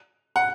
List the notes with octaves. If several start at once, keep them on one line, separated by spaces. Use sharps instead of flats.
F#5